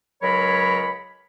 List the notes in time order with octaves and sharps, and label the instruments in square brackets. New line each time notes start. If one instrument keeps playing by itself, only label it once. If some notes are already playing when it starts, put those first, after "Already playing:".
[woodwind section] C#2 F#3 A#4 C#5 B5